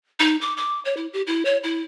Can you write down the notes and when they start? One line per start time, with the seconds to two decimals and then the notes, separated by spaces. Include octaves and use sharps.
0.20 D#4
0.41 D6
0.57 D6
0.85 C#5
0.97 E4
1.13 G4
1.27 E4
1.45 C#5
1.63 E4